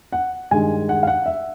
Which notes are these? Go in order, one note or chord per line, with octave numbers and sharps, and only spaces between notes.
F#5
G2 D#3 G#3 G#5
F#5
F5
F#5
E5